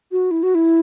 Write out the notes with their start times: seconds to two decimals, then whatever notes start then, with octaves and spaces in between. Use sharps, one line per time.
0.12 F#4
0.31 E4
0.43 F#4
0.55 E4